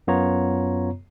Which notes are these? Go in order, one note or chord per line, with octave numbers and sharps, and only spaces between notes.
F#2 B3 F4 C#5 A#5